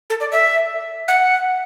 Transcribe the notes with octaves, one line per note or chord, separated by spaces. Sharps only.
A4
D5
E5
F#5